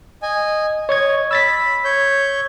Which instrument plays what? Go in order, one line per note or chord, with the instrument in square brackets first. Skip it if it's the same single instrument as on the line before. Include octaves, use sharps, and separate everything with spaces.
[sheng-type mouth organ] D#5 G#5
[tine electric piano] C#5 C#6 G#6 [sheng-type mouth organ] D#5
[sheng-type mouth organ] B5 [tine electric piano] E6 A6 B6
[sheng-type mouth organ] C#5 G6